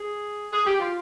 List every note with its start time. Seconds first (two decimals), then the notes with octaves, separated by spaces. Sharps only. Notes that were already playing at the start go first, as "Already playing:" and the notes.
Already playing: G#4
0.52 G#4
0.66 G4
0.79 F4